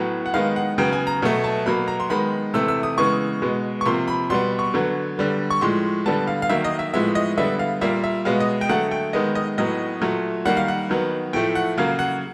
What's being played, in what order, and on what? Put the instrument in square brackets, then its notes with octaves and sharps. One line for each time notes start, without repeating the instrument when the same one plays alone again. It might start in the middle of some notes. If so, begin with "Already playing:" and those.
Already playing: [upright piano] A2 F#3 B3
F#5
D#3 G#3 B3 F5
F#5
C#3 F#3 B3 G5
G#5
A#5
B2 F#3 A3
A5
B2 F#3 A#3 B5
A#5
C6
D#3 G#3 B3 B5
C3 E3 A3 E6
E6
D#6
C#3 E3 G#3 B3 C#6
B2 G#3 B3
C#6
C3 F3 A#3 C6
B5
B2 G3 B3 C6
C#6
D3 F#3 B3
D3 G3 B3
C#6
A2 F3 G#3 C6
D3 G3 B3 A5
F5
F5
D#3 F#3 A#3 E5
D#5
E5
A2 F3 G#3 B3 E5
D#5
D3 G3 B3 E5
F5
A#2 G3 A#3 E5
E5
B2 G#3 B3 F5
D#5
G5
D3 F#3 A3 F#5
G5
D#3 G#3 B3 D#5
D#5
A2 F#3 B3 D#5
A#2 F#3 A3
D#3 G3 A#3 F#5
F5
F#5
D#3 F#3 B3
A2 F3 A3 G5
F#5
C#3 F#3 A#3 F5
F#5